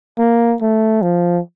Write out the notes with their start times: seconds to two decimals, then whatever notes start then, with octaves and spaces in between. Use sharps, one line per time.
0.18 A#3
0.61 A3
1.02 F3